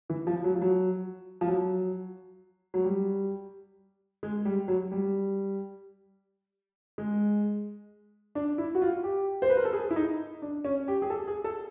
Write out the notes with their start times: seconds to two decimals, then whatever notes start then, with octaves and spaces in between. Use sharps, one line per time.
0.10 E3
0.27 F3
0.44 F#3
0.55 F3
0.61 F#3
1.41 F3
1.47 F#3
2.74 F#3
2.84 G3
4.23 G#3
4.45 G3
4.68 F#3
4.92 G3
6.98 G#3
8.35 D4
8.58 E4
8.75 F#4
8.82 F4
9.04 G4
9.42 C5
9.49 B4
9.57 A#4
9.65 A4
9.73 G#4
9.91 E4
9.96 D#4
10.42 D4
10.65 C#4
10.88 G4
11.02 G#4
11.10 A4
11.28 G#4
11.44 A4